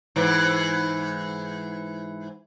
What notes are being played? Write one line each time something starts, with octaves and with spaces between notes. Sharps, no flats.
G#2 E3